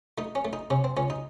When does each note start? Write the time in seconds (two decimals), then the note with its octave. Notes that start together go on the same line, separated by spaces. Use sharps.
0.18 A3 D#4
0.35 C#4
0.45 A3
0.53 D#4
0.70 C3 C#4
0.84 C4
0.97 C#2 C#4
1.10 D#4